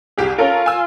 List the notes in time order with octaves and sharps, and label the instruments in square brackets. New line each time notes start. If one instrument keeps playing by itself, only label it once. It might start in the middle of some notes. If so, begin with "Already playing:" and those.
[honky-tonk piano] C2 G4 G#4
[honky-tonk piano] C#4 A4 A#4 [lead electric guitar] F4
[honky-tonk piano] G#5 E6